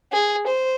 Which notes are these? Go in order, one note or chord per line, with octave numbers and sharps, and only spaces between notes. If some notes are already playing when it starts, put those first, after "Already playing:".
G#4
C5